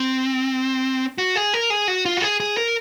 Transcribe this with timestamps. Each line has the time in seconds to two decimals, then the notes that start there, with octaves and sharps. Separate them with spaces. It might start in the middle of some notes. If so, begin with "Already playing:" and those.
Already playing: C4
1.18 F#4
1.36 G#4
1.54 A#4
1.70 G#4
1.88 F#4
2.05 F4
2.17 F#4
2.22 G#4
2.40 G#4
2.57 A#4